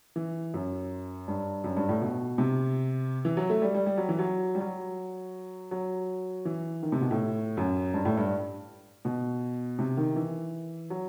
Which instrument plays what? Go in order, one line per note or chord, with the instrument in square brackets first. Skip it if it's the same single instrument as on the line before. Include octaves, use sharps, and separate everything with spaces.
[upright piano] E3
F#2
G2
F#2
G2
A2
B2
C3
E3
F#3
A3
G3
G3
G3
F#3
E3
F#3
G3
F#3
F#3
E3
D#3
C3
B2
A2
F#2
G2
A2
G2
B2
C3
D#3
E3
F#3